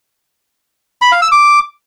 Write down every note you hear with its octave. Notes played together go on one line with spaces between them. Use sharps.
B5
F5
E6
D6